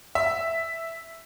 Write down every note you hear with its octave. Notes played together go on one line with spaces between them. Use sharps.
E5